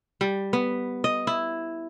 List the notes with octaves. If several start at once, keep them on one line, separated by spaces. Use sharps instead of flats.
G3
B3
D#5
E4